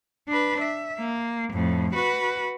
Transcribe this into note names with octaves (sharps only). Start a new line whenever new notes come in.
D4 B4
E5
A#3
F2 A2
F#4 B4